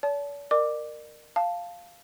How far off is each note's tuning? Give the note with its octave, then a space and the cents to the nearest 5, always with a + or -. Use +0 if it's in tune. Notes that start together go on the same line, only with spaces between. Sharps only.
D5 -45 A5 -15
A#4 +0 D5 +40 D6 +0
F5 +0 A5 +0